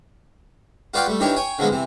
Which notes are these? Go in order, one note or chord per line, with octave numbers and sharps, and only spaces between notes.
F4 F#4 B4 D5 F5 G5
G3 A3
D#3 E3 D4 G4 C#5
C#5 G5 G#5
D3 F3 F#3 G#3 B3
C3 E3